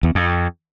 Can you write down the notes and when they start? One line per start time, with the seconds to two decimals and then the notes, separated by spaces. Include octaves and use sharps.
0.03 E2
0.15 F2